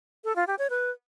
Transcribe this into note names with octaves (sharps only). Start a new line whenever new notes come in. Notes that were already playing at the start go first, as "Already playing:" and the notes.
A4
F4
G4
C#5
B4